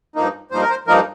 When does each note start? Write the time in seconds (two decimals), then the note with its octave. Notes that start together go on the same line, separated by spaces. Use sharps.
0.16 G2 F3 A#3 D#4
0.51 G2 F3 A#3 D#4 C5
0.62 A#4
0.70 C5
0.87 G2 F3 A#3 D#4 A#4